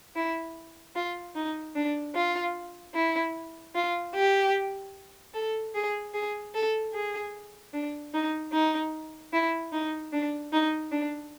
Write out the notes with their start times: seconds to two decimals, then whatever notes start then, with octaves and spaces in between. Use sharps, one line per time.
0.16 E4
0.95 F4
1.35 D#4
1.75 D4
2.15 F4
2.94 E4
3.75 F4
4.15 G4
5.33 A4
5.75 G#4
6.14 G#4
6.54 A4
6.93 G#4
7.73 D4
8.14 D#4
8.53 D#4
9.33 E4
9.72 D#4
10.13 D4
10.53 D#4
10.92 D4